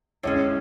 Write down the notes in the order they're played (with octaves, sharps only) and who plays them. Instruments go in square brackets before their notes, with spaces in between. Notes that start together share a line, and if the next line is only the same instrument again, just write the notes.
[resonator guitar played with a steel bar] A2 G#3 C#4 [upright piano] C#5